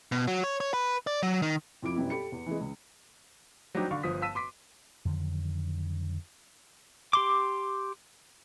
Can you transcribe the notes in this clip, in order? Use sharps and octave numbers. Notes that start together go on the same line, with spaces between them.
B2
F#3
C#5
C#5
B4
D5
F#3
D#3
F2 F3 E4 D6 D7
F#2 B2 G3 B3 E4
G4 A4 B5 C#7
E2
E3 G#3
C#2
F#3 G3 C4 D4 D#4 G4
D3 D4 F5 C#6
G1 F3 D#6 B6
F5 A5 E6 B6 D#7
C6 D6 B6
F2 D3 D#3 F#3
G4 C6 D6